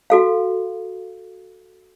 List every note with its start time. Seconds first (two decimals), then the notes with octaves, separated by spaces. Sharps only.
0.10 F#4 A4 F5